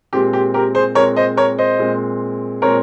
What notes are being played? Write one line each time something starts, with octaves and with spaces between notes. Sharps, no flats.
A#2 G#3 C4 G4
G4
G4 A#4
G#4 C5
A#2 G#3 C4 A#4 C#5
C5 D#5
A#4 C#5
C5 D#5
A#2 G#3 C4
A#2 G#3 C4 A#4 C#5